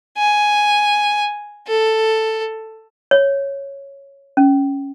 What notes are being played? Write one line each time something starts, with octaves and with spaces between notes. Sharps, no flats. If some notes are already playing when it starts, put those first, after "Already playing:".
G#5
A4
C#5
C#4